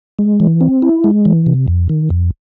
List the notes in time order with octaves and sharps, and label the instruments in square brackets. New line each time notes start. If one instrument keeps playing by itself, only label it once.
[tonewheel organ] G#3
E3
C4
E4
G#3
E3
C3
F2
D#3
F2